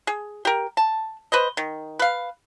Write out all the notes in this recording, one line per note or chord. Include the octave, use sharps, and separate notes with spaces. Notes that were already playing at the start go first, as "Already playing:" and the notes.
G#4
G4 A#4
A5
B4 C5 D#5
D#3
B4 F5